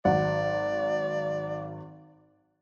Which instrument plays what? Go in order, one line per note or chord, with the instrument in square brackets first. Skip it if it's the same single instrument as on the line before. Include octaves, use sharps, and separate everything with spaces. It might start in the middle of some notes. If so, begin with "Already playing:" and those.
[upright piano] G#1 F#3 F#5 [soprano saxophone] D5